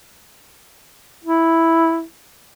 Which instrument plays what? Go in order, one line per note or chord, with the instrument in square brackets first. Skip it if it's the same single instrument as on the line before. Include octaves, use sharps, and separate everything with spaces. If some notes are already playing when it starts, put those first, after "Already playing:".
[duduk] E4